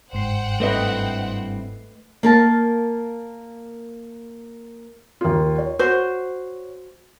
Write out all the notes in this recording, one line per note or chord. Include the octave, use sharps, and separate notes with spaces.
G1 G#2 C5 F#5 G5 C7
G2 A3 C4 E4 B4 D#5
A#3 A#4 A5
D#2 F4
C#5
F#4 C5